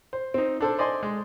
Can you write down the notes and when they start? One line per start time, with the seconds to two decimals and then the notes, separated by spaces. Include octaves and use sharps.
0.13 C5
0.34 C4 D#4
0.61 D4 A4 C5
0.78 C5 D5 D#5 G#5 C6
1.03 G#3